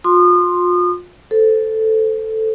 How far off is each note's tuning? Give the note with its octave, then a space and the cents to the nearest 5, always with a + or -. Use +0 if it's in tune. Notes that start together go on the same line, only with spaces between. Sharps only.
F4 +35 C6 +0 D#6 -35
A4 +0 C5 -15